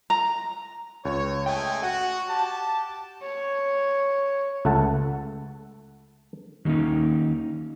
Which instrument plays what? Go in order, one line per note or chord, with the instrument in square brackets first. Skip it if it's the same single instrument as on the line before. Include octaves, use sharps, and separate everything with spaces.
[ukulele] A#5
[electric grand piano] C#2 [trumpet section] C#5
[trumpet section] G#3 A3 G#5 [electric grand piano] G5
[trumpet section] F#4 [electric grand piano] F#5
[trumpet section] G4 A5
[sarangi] C#5
[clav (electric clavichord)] C#2 A3 E5 F#5 A5
[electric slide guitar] D#3 F#3 A#3 C#4 D#4